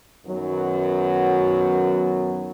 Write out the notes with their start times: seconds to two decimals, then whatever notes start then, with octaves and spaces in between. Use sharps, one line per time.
0.24 F#2 D#3 F#3 B3